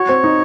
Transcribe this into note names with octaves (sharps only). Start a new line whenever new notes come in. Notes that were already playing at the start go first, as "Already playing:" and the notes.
Already playing: F#4 C#5
C4
D#4